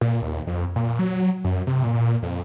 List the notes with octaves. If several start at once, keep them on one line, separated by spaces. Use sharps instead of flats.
A#2
D#2
F2
A#2
F#3
F#2
C3
A#2
F2